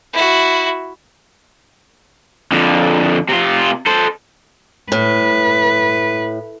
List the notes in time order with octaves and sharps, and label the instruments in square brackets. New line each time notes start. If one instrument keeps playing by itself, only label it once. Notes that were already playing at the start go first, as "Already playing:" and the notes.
[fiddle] E4 F#4
[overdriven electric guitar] F2 D3
C3 F4
A4 C5
[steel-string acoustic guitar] A2 [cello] B4